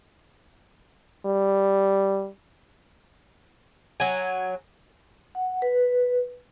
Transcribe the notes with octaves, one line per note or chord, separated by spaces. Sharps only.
G3
F#3 G#5
F#5
B4